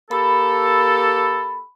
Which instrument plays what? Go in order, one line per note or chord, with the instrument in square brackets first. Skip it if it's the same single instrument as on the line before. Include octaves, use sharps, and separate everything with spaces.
[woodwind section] A#3 G4 A4 [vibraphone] B5